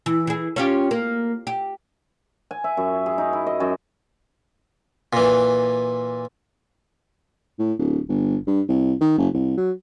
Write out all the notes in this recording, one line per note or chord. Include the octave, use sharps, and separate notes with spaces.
E3
E3 G#4
C#4 F4 G4
A#3
G4
G#5
E5
F#2
G#4
D#4
E4
D#5
F#2
A#2 E3
A2
D1
G1
G2
C2
D#3
F#1
C2
F#3